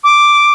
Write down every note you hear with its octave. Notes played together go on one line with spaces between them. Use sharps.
D6